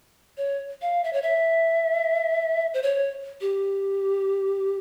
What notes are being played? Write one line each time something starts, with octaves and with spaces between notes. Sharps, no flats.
C#5
F5
E5
C#5
E5
C5
C#5
G4